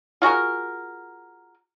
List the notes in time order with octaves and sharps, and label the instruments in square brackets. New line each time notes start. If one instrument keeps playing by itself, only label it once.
[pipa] F4 F#4 G#4 A#4